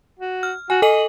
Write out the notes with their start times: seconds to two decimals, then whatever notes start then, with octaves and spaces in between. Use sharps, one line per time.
0.19 F#4
0.43 F6
0.70 F#4 G#5
0.82 A4 D#5 G#5 F#7